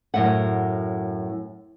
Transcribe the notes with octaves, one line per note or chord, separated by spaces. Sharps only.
F#2 A2 F#5